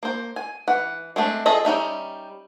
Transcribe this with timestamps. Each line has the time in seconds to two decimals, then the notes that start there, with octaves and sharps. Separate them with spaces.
0.03 A#3 C5
0.36 G#5
0.68 E3 F#5
1.16 G#3 A3 C4 D4
1.46 F4 G#4 A4 D#5 E5
1.65 G3 C#4 D#4 E5